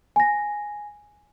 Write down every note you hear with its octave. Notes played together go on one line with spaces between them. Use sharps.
G#5 A#6